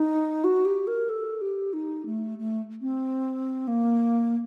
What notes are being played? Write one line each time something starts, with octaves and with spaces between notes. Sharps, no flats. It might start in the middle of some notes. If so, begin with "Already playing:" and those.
Already playing: D#4
F#4
G4
A#4
A4
G4
D#4
A3
A3
C4
A#3